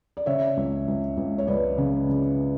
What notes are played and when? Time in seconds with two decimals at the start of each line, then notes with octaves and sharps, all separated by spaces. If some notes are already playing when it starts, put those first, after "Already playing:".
0.17 D5
0.26 C#3 C#5 E5
0.57 C#2
0.88 C#2
1.17 C#2
1.38 C#5
1.47 C#2 B4 D5
1.78 C#3
2.09 C#3